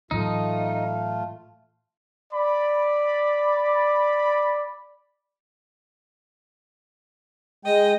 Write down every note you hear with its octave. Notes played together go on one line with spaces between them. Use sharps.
A2 E3 F#3 A3 D#4 F4
D5 B5
G#3 D#5 G5